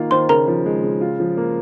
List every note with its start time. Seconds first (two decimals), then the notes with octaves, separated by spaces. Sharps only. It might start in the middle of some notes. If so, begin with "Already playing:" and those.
Already playing: D#3 A#3 F4
0.11 D#3 C5 C6
0.29 C#3 A#4 A#5
0.48 F3
0.66 G#3
0.83 C#3
1.01 F4
1.20 F3
1.37 A#3